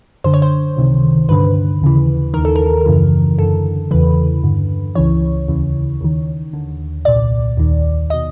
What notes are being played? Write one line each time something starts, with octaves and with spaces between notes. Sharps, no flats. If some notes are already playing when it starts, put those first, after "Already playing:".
F#2 D3 C5
C#5
C5
C#2 C3 D#3
G2 D3 B4
D#2 C#3 E3
D#2 D#3 A#4
A4
A#4
F#2 C#3 E3
F#2 D3 A4
E2 C#3 E3 B4
G2 D3
C#2 C#3 E3 C#5
D#2 C#3 E3
D#2 D#3
D#2 D3
C2 A#2 D5
D#2 D#3
B2 D#5